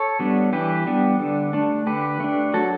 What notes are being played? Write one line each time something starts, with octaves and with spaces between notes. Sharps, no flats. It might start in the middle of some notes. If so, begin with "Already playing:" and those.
Already playing: A4 C#5
G3 B3 D4
E3 G4 B4
G3 B3 D4
D3
A3 D4
D3 G4 B4
A3 D4
F#3 F#4 A4